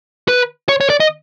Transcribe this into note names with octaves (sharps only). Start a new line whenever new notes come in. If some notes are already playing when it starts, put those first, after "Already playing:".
B4
C#5
C#5
D5
D#5